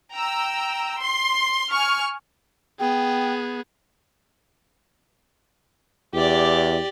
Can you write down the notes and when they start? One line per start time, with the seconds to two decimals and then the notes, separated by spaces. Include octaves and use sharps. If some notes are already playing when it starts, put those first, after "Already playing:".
0.13 G5 A#5 E6
1.01 C6
1.72 G#5 C#6 F6
2.80 B3 G#4 G5
6.13 E2 G4 D5